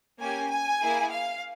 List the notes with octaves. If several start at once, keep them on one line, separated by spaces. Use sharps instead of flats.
A#3 C#4 G4 G#5
G#5
A#3 E4 G#4
F5